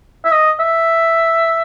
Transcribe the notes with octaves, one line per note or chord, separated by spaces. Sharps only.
E5
D#5
E5